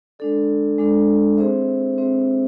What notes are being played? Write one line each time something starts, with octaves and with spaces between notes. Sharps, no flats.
G#3 D4 A4 D5
G#3 D4 A4 D5
C4 G#4 C5 E5
C4 G#4 C5 E5